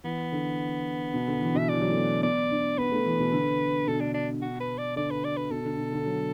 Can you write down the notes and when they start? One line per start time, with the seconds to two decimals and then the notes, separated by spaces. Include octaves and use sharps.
0.04 E3 B3
0.32 D3
1.14 B2
1.28 D3
1.41 E3
1.55 B2 E5
1.69 E3 D5
1.81 F#3
1.88 A3
1.96 B3
2.23 B3 D5
2.51 D4
2.78 B3 B4
2.92 A3
3.06 E3
3.19 B2
3.32 D3
3.87 B2 A4
4.00 D4
4.14 D4
4.42 F#4
4.60 B4
4.78 D5
4.96 D3 D5
5.11 B4
5.25 D5
5.37 B4
5.51 B2 A4
5.65 D3
5.78 B2
5.93 D3
6.06 F#3